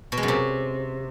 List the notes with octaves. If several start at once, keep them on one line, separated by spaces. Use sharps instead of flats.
B2
G#3
F#2
C3